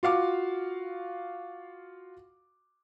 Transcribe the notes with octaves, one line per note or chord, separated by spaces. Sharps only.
F4 F#4 F5 D6